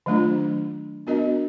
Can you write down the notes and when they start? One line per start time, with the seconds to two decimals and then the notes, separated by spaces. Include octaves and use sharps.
0.06 D#3 F#3 A3 D4 F4
1.07 B3 D4 F#4 A#4 D#5